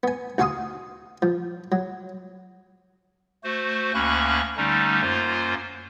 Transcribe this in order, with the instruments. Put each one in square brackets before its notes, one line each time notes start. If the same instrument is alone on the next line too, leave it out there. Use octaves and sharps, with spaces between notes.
[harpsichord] B3 G#5
D2 F#4 F5 G#5 C6 D#6
F3
F#3
[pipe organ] A3 F#4 C5
D2 A#3 C#4 B5 C#6 F#6
D3 G3 A3 C#4 D#4
F#2 A#3 F4 C5